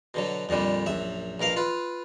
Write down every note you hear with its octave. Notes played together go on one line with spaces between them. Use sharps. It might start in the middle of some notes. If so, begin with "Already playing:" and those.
B2 D3 F#3
F2 A#2 D3 G3
A#1 F#2 E5
A#1 B2 A#4 F5
F4 B4